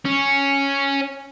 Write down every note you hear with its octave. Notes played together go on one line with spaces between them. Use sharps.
C#4